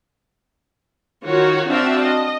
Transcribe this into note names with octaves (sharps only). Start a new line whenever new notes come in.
D#3 F4 F#4 C#5
C4 D4 F#4 E5 F5 A5
D#5